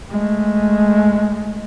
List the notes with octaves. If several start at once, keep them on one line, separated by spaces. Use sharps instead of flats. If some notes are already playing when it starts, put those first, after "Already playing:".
G#3 A3